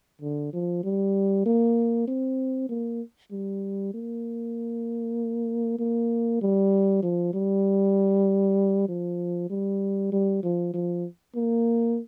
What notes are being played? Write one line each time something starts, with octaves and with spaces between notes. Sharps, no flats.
D3
F3
G3
A#3
C4
A#3
G3
A#3
A#3
G3
F3
G3
F3
G3
G3
F3
F3
A#3